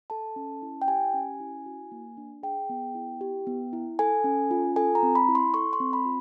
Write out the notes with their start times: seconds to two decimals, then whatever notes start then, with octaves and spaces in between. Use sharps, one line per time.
0.10 A4 A5
0.36 C#4
0.62 E4
0.82 G5
0.87 G4 G#5
1.14 C#4
1.40 E4
1.66 F#4
1.92 A#3
2.17 D4
2.43 G#4 G5
2.69 B3
2.95 E4
3.21 G4
3.47 B3
3.73 E4
3.99 A4 G#5
4.24 C#4
4.51 F4
4.76 A4 G#5
4.95 A#5
5.03 C4
5.15 B5
5.28 E4
5.35 C6
5.54 A4 C#6
5.73 C6
5.80 C4
5.93 B5
6.05 F4